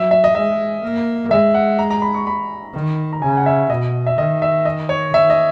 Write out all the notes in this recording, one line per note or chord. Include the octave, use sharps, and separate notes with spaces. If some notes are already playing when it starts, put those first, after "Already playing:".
Already playing: F#3 E5
E5
D#5
G#3 E5
A#3
G#3 E5
F#5
A#5
A#5
B5
C#6
B5
D#3
A#5
C#3 G#5
F#5
E5
B2 D#5
E5
D#3 D#5
E5
D#5
C#5
D#3 E5
D#5